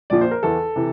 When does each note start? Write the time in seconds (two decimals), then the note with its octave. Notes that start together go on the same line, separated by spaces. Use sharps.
0.10 A#1 A#2 F3 D5
0.21 C5
0.31 A#4
0.43 E2 E3 A4
0.76 C3 E3